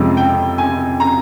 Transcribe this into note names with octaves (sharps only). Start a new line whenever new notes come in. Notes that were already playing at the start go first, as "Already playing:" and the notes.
Already playing: F2 C3 F3 G#3 C#4
G5
G#5
A#5